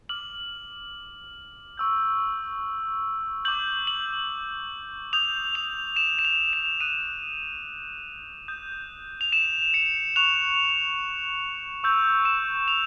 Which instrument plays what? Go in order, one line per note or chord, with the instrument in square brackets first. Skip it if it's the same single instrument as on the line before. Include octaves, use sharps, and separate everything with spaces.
[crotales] D6 F6 F#7
C#6 E6 G6
D6 G6 F#7
F#7
D#6 G6 F7
F7
E7
E7
F7
E7
D#6 F#6 D#7
D#6 G6
F7
E7
C#7
C#6 F#6 F7
C#6 E6 G6
E7
F7